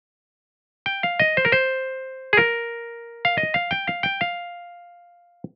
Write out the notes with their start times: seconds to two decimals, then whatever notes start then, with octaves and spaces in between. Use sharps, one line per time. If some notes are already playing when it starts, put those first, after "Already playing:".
0.86 G5
1.03 F5
1.20 D#5
1.37 C5
1.45 A#4
1.52 C5
2.33 G#4
2.37 A#4
3.25 F5
3.38 D#5
3.54 F5
3.71 G5
3.87 F5
4.03 G5
4.21 F5